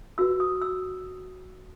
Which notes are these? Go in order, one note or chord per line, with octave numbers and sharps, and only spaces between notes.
F#4 B4 E6
D#6
E6